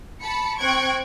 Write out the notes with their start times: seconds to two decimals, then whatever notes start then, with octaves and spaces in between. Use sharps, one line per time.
0.21 A5 B5 C#7
0.59 C4 G5 C#6 F#6 G#6 D7